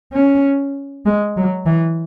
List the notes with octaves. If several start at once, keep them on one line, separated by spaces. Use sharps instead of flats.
C#4
G#3
F#3
E3